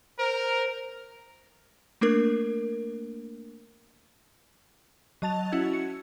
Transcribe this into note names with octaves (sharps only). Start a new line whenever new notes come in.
A#4 C5
A3 A#3 D4 A#4
F#3 D#5 A5 A6 F7
C#4 E4 F#4 E6 G#6
C#7